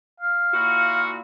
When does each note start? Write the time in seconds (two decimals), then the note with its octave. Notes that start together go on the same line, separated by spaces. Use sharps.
0.20 F5
0.53 A#2 E4 F#4